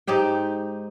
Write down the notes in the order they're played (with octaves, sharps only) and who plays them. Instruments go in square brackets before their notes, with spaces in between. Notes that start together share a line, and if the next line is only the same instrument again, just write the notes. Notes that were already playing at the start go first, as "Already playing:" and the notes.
[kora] G#2 D#4 G4 G5